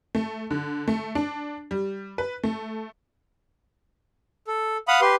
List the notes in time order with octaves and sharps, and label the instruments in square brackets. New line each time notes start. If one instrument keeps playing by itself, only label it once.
[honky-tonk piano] A3
D3
A3
D4
G3
B4
A3
[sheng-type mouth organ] A4
F5 F#5 B5 D#6
G4 B4 C6